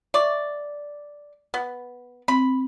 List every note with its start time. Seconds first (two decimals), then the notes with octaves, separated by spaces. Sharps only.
0.14 D5 E5 C#6 D6
1.54 B3
2.28 C4 B5